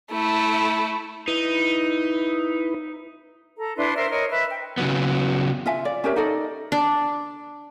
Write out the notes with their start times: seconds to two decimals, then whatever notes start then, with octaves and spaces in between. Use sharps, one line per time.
0.12 A3 E4
1.28 D#4 E4 B4
3.57 A4 A#5
3.77 D4 E4 B4 C6
3.96 A#4 C5 E5 C6
4.10 A#4 C#5 D#5
4.30 B4 E5
4.48 G5
4.78 C#3 F#3 B3
5.66 F4 E5 G#5
5.85 D5
6.04 C#4 G4 A#4 E5
6.16 D#4 A4 D5 D#5
6.72 D4